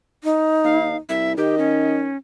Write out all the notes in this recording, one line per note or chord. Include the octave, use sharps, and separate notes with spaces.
D#4
D#2 F5
C2 E5
D#3 G4 D#5
C#4